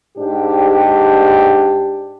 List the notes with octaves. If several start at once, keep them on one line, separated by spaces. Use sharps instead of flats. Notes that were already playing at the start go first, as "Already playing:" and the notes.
G#2 D4 G4